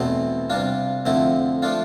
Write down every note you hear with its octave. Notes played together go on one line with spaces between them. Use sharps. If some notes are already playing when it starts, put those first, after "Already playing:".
Already playing: E2 B2 A3 C4
C3 G3 D4 F4
F2 D3 A3 C4 E4
F3 A3 D4 F4